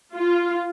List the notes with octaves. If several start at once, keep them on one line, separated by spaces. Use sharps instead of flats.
F4